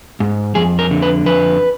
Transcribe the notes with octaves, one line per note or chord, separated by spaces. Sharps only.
G#2
F2 G#4
A#4
D3
B4
F2 B4